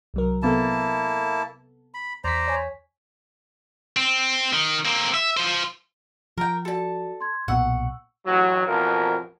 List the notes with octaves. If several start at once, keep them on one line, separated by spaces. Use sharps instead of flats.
C2 F#3 A#4
C3 A#3 B3 E4 A4 A5
B5
E2 C5 D5 A#5 B6
C#5 G#5
C4
D#3
A#3 C4
E5
F4 C5
F3 A#4 G5
F#4 A4 D5 A5
C6 G#6
B1 A#2 B3 F#5 C#6 E6
A1 F#3
A1 F2 B2 F3 A#4